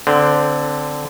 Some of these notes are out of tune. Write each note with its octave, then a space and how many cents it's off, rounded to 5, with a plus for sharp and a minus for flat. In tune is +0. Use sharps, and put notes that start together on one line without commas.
D3 +0 C4 -15